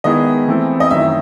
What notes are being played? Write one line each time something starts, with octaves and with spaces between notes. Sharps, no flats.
D#3 G#3 B3 E4 G#4 D#5
E3 A3 C4 E4 A4
D#5
F#2 D#3 F#3 E5